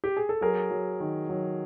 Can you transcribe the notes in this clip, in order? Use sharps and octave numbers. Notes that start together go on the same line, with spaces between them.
G4
G#4
A4
F#3 G#4 A#4
F#3
D#3
F#3